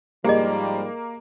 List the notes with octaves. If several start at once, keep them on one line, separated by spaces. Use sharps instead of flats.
G#2 F3 G3 A#3 G4 G#4 D#5